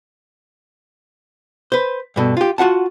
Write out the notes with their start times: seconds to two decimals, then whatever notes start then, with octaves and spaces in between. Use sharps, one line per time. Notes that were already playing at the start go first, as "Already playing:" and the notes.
1.72 B4 C5
2.16 G2 B2 A4
2.37 F4 G4
2.58 F4 F#4 F#5 A5